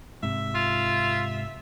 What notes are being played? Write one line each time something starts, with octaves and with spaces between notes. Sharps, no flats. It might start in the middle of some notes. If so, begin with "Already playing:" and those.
G#2 C3 E5
F4